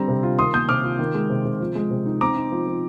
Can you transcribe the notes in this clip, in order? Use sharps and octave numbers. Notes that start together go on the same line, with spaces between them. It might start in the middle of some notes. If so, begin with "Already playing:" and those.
Already playing: D3 G3 C4 A#5
C3
F4
D#3 C6 D#6
A#3 D#6 G6
C3 D6 F6
F4
D#3
G#3
C3
C3
F3
G#3
C3
D#4
C4 A#5 D6
D#4
F3
F3